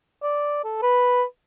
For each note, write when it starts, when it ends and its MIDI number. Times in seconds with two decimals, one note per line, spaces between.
0.23 0.60 74
0.64 0.80 69
0.82 1.23 71